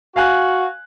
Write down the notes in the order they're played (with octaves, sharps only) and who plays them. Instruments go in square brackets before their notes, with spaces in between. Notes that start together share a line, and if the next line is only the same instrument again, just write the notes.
[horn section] F#4 [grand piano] F5 G#5 F#6